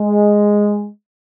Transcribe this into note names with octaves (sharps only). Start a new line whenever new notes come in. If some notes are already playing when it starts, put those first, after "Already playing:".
Already playing: G#3